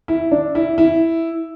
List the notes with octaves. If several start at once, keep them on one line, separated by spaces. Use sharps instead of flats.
E4
D4
E4
E4